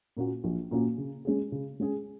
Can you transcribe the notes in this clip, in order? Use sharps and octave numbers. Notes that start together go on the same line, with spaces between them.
A#2 A#3 C#4 F#4
A#1
A#2 A#3 C#4 F#4
C#3
G#3 C#4 G#4
C#3
G#3 C#4 G#4